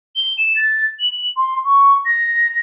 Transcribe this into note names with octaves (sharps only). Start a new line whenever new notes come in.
G7
E7
A6
F#7
C6
C#6
A#6